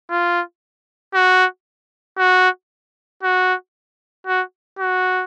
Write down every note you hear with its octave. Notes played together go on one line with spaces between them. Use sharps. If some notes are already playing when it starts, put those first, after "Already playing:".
F4
F#4
F#4
F#4
F#4
F#4